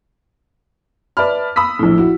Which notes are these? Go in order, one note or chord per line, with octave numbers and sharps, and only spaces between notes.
B4 D5 E5 A5 B5 F6
B5 D#6 E6 B6
A#1 A2
E4 F#4